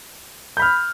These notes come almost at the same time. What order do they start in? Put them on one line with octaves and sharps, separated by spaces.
G6 B5 F6